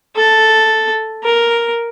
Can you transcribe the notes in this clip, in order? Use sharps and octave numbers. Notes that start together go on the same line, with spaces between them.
A4
A#4